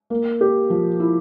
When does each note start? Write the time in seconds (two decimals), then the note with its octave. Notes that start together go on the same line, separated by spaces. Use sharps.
0.10 A#3
0.41 G4
0.70 F3
1.00 E4